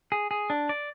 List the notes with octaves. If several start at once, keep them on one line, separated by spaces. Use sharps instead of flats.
G#4
G#4
D4
D5